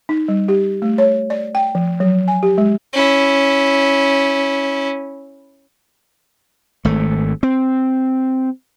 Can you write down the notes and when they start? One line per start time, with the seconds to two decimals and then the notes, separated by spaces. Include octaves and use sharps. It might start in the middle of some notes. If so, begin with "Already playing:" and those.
0.09 D#4
0.28 G3
0.48 G4
0.82 A3
0.98 C#5
1.30 D5
1.55 G5
1.75 F3
2.00 F#3
2.28 G#5
2.43 G4
2.58 G#3
2.93 C#4 E4
6.85 G#1 A3
7.43 C4